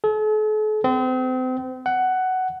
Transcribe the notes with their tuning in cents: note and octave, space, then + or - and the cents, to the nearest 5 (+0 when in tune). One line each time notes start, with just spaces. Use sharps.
A4 -45
C4 -35
F#5 +10